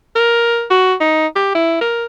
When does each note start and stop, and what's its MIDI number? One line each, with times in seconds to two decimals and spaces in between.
0.16 0.65 70
0.70 0.94 66
1.00 1.27 63
1.36 1.50 67
1.55 1.78 64
1.81 2.05 70